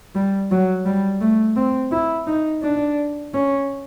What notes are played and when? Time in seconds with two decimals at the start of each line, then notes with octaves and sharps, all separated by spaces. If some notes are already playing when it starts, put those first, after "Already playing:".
0.15 G3
0.51 F#3
0.85 G3
1.21 A3
1.56 C4
1.92 E4
2.27 D#4
2.62 D4
3.34 C#4